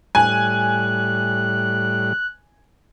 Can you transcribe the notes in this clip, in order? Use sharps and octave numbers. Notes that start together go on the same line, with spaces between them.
A2 G3 G#5 F#6